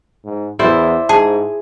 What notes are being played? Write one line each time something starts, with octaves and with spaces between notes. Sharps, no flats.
G#2
E2 E4 C5 D5
G#2 G#4 A5